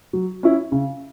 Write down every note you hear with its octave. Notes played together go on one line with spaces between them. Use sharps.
F#3
C#4 E4
C#3